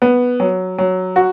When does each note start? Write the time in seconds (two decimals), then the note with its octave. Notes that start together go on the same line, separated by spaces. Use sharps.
0.02 B3
0.40 F#3
0.78 F#3
1.16 F#4